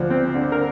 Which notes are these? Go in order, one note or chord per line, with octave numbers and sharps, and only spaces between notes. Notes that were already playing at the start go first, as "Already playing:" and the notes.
Already playing: D2 F3
C4
D3
A#4